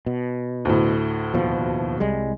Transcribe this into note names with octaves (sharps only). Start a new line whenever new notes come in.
B2
D2 A2
D#2 B2 F3
C2 G3 G#3